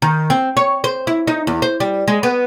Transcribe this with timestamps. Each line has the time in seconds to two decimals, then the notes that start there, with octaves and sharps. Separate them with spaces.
0.02 D#3
0.30 C4
0.57 C#5
0.84 C5
1.07 E4
1.27 D#4
1.47 E2
1.62 C5
1.80 G3
2.08 G#3
2.23 B3